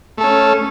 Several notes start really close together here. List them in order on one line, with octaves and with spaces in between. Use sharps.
A3 A4 C#4